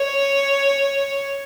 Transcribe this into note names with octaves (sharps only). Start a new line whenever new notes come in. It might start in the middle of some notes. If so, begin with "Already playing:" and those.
Already playing: C#5